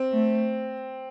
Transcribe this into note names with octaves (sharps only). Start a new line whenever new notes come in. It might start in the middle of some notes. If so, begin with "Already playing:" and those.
Already playing: C4
A3